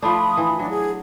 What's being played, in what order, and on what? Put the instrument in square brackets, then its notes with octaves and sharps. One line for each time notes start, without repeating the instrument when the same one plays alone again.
[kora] F3 A3 D4 [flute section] B5 D#6
[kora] E3
[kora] F#3 [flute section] D4
[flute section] G#4